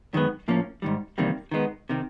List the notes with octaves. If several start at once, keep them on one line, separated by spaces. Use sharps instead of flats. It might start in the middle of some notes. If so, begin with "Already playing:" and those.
F#2 D#3 G#3 B3
A2 F3 A#3 C#4
G#2 D#3 G3
E2 C3 D#3 G3 A#3
D#3 G#3 B3
C3 D#3